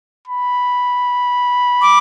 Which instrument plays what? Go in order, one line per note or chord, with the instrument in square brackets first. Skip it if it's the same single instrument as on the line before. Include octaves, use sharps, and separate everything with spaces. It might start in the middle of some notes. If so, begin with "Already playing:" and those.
[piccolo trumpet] B5
[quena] D6